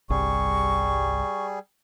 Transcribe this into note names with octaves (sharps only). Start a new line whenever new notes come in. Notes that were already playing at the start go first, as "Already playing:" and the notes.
G1 C2 G3 G#4 C#6